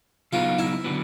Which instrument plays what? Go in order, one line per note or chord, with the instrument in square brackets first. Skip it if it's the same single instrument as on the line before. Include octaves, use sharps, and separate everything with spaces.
[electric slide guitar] C#3 F#3 B3 D#4 [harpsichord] F4
[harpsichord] E4
[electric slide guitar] D3 F#3 B3